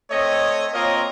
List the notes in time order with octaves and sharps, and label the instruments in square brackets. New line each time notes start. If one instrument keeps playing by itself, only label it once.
[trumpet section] A3 C4 C#5 D#5
A#3 C4 F4 A#4 C#5 D#5